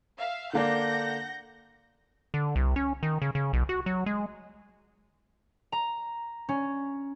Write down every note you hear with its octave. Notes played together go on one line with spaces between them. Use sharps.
E5 F5
D3 A#3 D4 F#5 G6 A#6
D3
C2
C#4
D#3
C#3
C#3
B1
F#4
F#3
G#3
A#5
C#4